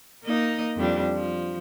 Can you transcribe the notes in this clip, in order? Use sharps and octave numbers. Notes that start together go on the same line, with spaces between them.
A#3 D#4 D#5
F2 G3 D4
F3